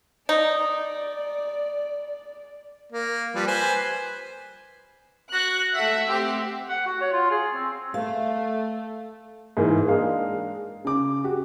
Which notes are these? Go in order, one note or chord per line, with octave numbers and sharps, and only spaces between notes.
D#4 D5
A#3
F3 G3 B4
B4 C5 G#5
F#4 F#6
A3 E5 F#5
C4 G4
F#5
F#4
C#5
F4
G#4
C4
A3 F5
G#2 E3 A#3
G#3 D4 A#4 F5
C#3 D6
F#4 G4